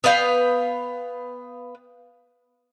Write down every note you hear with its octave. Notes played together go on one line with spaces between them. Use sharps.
B3 B4 F5 G5